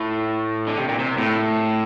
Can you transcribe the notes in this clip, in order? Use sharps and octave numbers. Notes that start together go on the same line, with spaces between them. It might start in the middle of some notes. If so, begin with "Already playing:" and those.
Already playing: A2
D3
C3
A#2
C3
A2